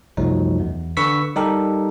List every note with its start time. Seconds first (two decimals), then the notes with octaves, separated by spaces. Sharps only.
0.17 C2 F#2 F3 F#3 A3 D#4
0.60 E2
0.97 D3 B4 C#6 E6 B6
1.36 G3 D#4 G4 A4 A#4